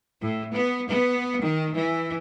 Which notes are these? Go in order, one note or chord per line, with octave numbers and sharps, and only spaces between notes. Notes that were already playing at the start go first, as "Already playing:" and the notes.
A2
B3
B3
D#3
E3